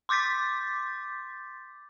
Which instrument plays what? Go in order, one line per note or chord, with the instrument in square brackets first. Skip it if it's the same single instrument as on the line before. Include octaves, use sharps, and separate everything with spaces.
[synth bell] C6 D6 G6 A6 B6